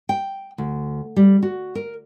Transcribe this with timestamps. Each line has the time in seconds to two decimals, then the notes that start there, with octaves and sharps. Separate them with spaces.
0.09 G5
0.58 D2
1.16 G3
1.43 F#4
1.75 A#4